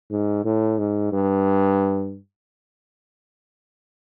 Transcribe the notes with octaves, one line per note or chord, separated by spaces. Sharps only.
G#2
A2
G#2
G2